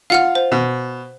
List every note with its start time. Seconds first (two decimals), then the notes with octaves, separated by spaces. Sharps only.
0.10 F4 F5 F#5 F6
0.35 C5
0.52 B2